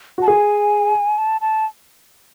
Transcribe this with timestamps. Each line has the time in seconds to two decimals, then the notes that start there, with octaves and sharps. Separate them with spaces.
0.18 F#4 A5
0.27 G#4 G#5
1.18 A5
1.41 A5